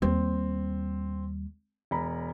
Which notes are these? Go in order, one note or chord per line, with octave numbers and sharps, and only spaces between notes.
D#2 G3 C4
E1 A#5 B5